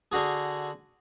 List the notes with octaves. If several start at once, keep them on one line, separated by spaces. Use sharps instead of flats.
D3 F#4 G#4